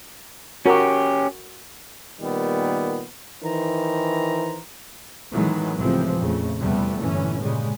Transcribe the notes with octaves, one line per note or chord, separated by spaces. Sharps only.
C#4 F#4 G4 A#4
A#2 D#3 G3 B3
D#3 E3 C5 A#5
A2 D#3 E3 F#3 G#3 B3
C#2 A2 C3 E3 F3 C4
F2 A#2 C#3 A3
E2 C3 G3 A3 B3
G1 A#2 E3 C#4
A#2 C#3 G3 G#3